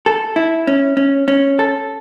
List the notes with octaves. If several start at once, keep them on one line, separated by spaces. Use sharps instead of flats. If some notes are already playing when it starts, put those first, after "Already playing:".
A4
E4
C#4
C#4
C#4
A4